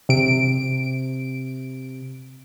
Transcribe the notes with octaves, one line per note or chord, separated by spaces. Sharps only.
C3 D7